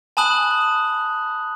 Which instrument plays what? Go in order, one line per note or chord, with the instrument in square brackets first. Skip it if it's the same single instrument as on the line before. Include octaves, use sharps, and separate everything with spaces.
[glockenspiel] G#5 A5 B5 D#6 F#6 F#7